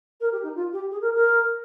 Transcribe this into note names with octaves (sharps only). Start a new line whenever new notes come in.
A#4
G4
D#4
F4
G4
G#4
A#4
A#4